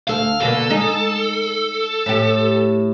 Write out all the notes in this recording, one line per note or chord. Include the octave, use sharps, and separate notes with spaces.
D2 A4 F5
B2 D3 A#3 A4
G#3 D#4
A2 G4